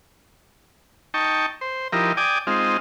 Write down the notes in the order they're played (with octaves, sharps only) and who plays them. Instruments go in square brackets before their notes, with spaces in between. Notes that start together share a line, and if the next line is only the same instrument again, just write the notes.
[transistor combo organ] D#4 G5 A5 C#6
C5
F3 D#4 E4 G4 A#4
D5 G5 G#5 D6 D#6
G#3 C4 D#4 F4